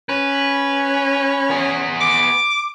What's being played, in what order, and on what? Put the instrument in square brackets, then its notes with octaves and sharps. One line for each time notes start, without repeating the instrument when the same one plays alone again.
[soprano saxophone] C#4 [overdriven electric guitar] B4
[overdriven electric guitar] B3 G#4
[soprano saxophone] D6